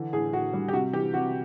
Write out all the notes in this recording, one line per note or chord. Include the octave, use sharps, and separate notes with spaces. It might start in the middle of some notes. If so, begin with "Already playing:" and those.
Already playing: D3 E3
A2 G#4
A2 F#4
G3
G4
C3 F#4
E3 G4
C3 F#4